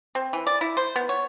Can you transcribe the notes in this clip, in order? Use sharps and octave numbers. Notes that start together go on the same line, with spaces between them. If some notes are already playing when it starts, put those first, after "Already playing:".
C4
E3
D5
E4
C5
B3
C#5